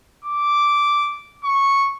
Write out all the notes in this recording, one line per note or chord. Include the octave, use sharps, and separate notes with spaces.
D6
C#6